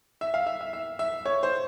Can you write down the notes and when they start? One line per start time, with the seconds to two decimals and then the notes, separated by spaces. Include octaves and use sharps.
0.21 E5
0.34 F5
0.47 E5
0.61 E5
0.73 E5
0.99 E5
1.25 C#5
1.43 C5